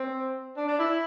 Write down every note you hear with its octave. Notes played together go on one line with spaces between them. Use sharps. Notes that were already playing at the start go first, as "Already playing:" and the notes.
Already playing: C4
D4
D4
E4